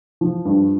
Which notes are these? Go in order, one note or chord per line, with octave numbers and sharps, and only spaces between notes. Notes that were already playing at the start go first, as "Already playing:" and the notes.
F3
G2